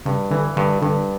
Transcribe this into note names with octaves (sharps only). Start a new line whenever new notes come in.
G2 C#3
D3 E3
G2 D3
G2 D3